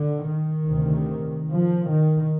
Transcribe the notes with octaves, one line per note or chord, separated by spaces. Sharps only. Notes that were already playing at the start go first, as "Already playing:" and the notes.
Already playing: D3
D#3
D2 C3
F3
D#3